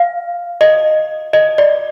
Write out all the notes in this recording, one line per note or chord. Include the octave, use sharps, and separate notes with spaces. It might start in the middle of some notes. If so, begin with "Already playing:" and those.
Already playing: F5
D#5
D#5
D5